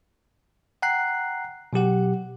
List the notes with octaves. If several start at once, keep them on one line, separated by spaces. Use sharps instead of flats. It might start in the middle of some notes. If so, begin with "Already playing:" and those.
F#5 G5 A#5 F#6 C7
B2 F#3 G4 F#5